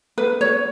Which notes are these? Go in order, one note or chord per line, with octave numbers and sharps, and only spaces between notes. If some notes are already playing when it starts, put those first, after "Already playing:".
B4
C#5